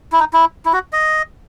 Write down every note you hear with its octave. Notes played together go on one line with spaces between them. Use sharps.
E4
D#4
E4
E4
F#4
D#5